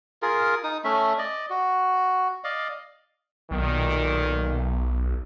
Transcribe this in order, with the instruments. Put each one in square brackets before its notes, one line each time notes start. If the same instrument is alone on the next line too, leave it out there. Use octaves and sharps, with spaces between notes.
[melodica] F4 G#4 A#4
D#4 D#6
A3 C#4 E5
D5 D#5
F#4
D5 D#5 F5
[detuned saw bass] B1 [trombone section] A#2 D#3